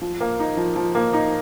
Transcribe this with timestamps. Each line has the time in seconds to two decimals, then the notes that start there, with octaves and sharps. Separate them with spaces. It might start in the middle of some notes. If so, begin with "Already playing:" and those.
0.01 F3
0.21 A#3
0.40 D#4
0.57 F3
0.76 F3
0.95 A#3
1.13 D#4